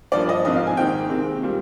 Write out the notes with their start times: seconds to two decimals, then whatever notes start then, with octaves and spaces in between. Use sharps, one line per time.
0.12 G2 F3 A#3 D5
0.29 D#5
0.45 G#2 F3 C4 D#5
0.56 F5
0.67 G#5
0.77 G#2 D#3 A#3 G5
1.10 C3 D#3 G#3 C4
1.43 A#2 G3 C4